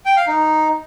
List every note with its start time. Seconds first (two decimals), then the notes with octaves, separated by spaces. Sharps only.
0.06 G5
0.16 F5
0.27 D#4